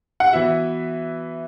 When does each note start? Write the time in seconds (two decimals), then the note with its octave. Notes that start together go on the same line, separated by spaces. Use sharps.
0.20 F#5
0.33 E3 B3 F#4 E5